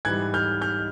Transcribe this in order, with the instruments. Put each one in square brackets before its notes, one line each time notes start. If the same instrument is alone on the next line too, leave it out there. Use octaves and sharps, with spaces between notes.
[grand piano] G#2 E3 G3 F#6 G#6
F6 G6
F6 G6